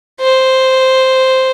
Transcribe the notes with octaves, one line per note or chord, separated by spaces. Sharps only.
C5